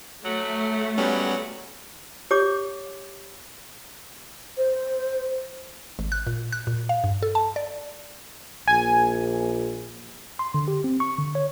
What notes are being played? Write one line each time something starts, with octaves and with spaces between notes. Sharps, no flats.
F#3 A3
F#3 G3 B3 C#4
G4 C#5 D6
C5
G#1
F#6
A#2
F#6
A#2
F5
G2
A4
A5
D5
A#1 G#5
C6
D3
G4
C4
C#6
D3
C#5